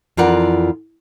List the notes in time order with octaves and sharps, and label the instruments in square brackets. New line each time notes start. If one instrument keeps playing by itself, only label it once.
[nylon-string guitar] F2 E3 F4 A#4 D5 F#5